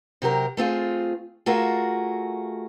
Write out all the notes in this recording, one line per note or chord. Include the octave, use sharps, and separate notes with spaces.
C3 F#3 G4 A#4
A3 C4 F4 G#4
A3 F4 F#4 G#4 A#4